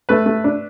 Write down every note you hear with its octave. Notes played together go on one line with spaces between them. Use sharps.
A3 B4
A3
D4